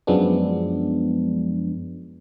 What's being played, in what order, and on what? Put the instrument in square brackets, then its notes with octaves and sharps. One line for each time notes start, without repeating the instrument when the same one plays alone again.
[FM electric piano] F#2 F3 G#3 B3 D4